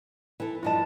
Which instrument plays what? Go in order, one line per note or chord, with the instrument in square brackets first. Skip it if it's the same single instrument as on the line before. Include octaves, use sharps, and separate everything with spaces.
[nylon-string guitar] E3 A4
[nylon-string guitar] G2 F3 D#5 [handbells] E4 A5